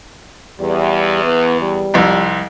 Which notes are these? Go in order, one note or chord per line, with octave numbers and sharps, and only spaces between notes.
E2 G3
B3
G3
C2 F2